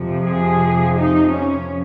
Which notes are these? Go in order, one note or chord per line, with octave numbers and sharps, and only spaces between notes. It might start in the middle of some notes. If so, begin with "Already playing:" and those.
Already playing: F2 C3 F3
G#4
D#4
C#4